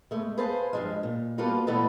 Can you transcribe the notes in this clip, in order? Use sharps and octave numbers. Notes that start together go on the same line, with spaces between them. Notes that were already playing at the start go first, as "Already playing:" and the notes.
G#3 A3
G#4 B4 C5 F5 A5
G2 F3 G#3
A#2
G3 A#3 B3 F4 F#4 A4
A#2 E3 A3 B3 D#4 A4